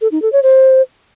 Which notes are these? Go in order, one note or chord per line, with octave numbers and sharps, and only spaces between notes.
A4
D#4
A4
C#5
C5